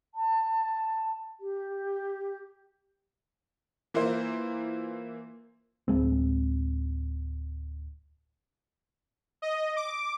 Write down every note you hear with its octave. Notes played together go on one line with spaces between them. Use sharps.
A5
G4
E3 A#3 E4 F4 C5
D1 E2 G#3 C4
D#5
D6